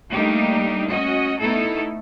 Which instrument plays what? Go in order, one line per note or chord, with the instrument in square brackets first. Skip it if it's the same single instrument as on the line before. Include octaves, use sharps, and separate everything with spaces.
[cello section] G3 A3 A#3 D4 D#4 G4
C#4 F#4 D#5
A3 B3 D#4 E4 A4